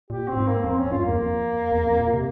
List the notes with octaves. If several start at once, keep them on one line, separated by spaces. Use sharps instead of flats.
A#2 G4
A#2 C4
G#2
A#3
F2 C4
C#4
F2
G2 F4
E2 A#3
F2
E2
F2
A#2
C3